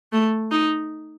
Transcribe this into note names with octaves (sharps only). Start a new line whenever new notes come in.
A3
D#4